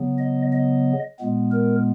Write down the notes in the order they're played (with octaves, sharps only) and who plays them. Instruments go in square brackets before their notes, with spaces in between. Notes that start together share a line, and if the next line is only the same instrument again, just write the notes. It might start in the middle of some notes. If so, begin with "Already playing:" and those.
Already playing: [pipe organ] C#3 F#3 B3
D#5
D#5
A#2 G#3 B3
A#4